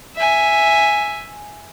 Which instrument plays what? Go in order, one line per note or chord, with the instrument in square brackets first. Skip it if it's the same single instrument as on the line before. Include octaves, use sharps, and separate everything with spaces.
[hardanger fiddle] E5 G#5